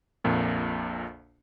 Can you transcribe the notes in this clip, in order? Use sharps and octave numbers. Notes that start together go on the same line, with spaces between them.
A#1 F2 A#2